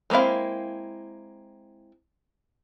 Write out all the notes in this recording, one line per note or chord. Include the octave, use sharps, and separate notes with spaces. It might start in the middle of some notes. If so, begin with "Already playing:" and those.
G#3 A#3 C4 E4 F5